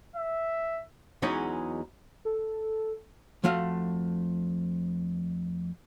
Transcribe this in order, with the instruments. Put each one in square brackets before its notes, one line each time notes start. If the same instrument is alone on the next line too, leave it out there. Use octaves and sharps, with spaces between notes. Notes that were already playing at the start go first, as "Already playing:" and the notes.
[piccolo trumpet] E5
[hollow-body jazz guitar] E2 E3 F#3 G#3 C#4 D#4
[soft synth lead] A4
[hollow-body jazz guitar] F2 F3 A3 F#4 F5